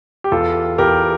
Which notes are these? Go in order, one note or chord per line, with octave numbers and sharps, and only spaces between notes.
G4
E2 F4 A4
E2 G4 A#4